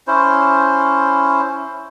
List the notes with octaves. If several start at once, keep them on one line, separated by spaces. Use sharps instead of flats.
C#4 E4 C5